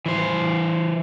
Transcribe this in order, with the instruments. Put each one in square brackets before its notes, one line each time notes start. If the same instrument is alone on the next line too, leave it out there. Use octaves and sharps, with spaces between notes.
[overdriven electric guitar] E3 C5